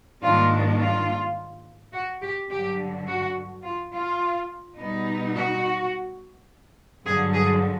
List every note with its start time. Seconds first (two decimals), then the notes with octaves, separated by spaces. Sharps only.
0.21 G#2 D#3 G3 A#3 D4 F4
0.80 F4
1.93 F#4
2.22 G4
2.50 G2 D3 F#3 G4
3.07 F#4
3.64 F4
3.93 F4
4.78 B2 G3 B3 D#4
5.36 F#4
7.05 G2 D3 F#3 G#4
7.34 G#4